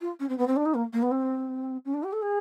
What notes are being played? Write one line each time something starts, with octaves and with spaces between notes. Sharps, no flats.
F4
C#4
C4
B3
C4
D4
D#4
A#3
A#3
B3
C4
C#4
D4
G4
A4
G#4